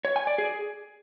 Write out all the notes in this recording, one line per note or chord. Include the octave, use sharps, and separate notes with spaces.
C#5
G#5
D5
G#4